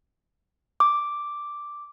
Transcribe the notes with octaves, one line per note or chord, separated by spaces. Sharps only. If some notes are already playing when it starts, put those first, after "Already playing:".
D6